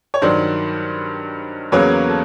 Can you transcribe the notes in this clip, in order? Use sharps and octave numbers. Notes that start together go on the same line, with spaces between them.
C#5
G2 D#3 F#3 C5 D5
E2 C#3 F#3 A#3 C#4 B4 C#5
A4